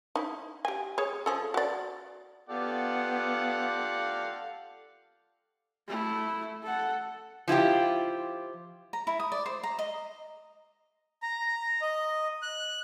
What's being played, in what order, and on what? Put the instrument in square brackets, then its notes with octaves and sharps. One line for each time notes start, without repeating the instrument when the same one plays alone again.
[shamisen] D#4 E4
G4 G#5
G#4 C#5
F3 G#4 A4
F#4 D5
[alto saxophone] B3 [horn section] F4 G4 F#5 [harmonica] A4 D5 F5
[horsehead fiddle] A3 E4
A4 F#5
[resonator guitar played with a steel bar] F3 E4 F4 G4
[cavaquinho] A#5
E4
D#6
D5
C5
A#5
D#5
[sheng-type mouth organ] A#5
D#5
F#6